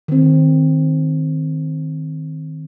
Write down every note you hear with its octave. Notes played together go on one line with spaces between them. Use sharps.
D#3 C4